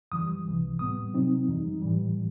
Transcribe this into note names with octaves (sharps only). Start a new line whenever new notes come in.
F#2 E3 G3 D#6
C2 C3 E3
A2 G3 B3 D#6
C3 F#3 C4 D#4
F#2 E3 G3 D#4
A2 E3 G3